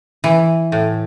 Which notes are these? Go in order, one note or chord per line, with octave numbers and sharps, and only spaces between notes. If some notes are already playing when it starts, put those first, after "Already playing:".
E3
A2